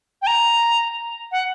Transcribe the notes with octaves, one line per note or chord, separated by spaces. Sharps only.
G5
A#5
F#5